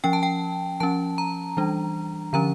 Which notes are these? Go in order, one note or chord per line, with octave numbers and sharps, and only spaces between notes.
F3 C#4 G5
A5
G5
F3 C#4 A5
A#5
E3 G3 D4
D3 F3 C#4 A#5